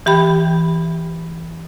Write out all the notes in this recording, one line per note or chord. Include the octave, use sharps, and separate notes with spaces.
E3 G4 G5 B5